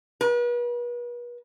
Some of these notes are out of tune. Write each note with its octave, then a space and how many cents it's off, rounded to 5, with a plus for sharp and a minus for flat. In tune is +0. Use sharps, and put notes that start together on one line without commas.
B4 -40